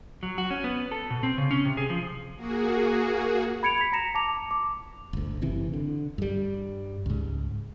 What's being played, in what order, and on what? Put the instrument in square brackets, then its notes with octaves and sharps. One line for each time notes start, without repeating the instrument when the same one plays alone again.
[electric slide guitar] F#3
F#4
C#4
B3
A4
B2
C4
C#3
C#4
C3
G#4
F3
[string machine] A#3 F#4 G#4
[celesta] B5 G#6 C#7 D7 F7
B6 F7
A#5 A#6 C#7 E7
A5 D6 F7
D6
[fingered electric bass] G1 D2
F#1 C3 E3
D3
G2 G3
C#2 G#2